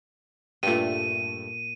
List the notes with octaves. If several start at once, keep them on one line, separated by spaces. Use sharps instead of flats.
G2 A#2 A3 G5 D#7